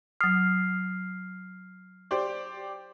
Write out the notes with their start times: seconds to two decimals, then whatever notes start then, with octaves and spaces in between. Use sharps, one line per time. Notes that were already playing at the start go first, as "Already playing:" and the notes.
0.21 F#3 D#6 F6 C7
2.11 G4 C5 D5